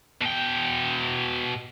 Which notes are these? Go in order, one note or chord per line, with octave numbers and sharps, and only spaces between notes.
B2 G5